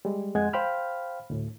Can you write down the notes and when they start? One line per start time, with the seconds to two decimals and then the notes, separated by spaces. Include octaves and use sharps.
0.05 G3 G#3
0.35 F2 G#3 G#4 F#5 G#6
0.53 C5 F5 G5 B5 F6
1.30 D2 A2